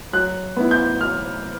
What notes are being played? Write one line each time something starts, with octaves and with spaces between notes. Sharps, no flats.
F#3 F#6
B3 E4
G6
F#3 F6